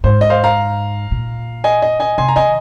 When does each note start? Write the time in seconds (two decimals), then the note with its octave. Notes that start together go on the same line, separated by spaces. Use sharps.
0.04 G#2 C5
0.21 D#5
0.30 C5 F5
0.44 F5 A#5
1.11 A#2
1.64 D#5 G#5
1.82 D#5
2.00 D#5 G#5
2.18 C3 G#5 C6
2.28 A#5
2.36 D#3 D#5 G#5